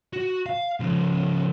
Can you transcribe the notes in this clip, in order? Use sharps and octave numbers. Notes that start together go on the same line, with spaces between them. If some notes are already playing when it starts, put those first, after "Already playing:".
F#4
F5
C#3 F3